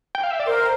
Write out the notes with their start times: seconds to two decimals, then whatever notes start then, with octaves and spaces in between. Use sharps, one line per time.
0.15 G5
0.23 F5
0.31 E5
0.40 D5
0.47 A#4 C5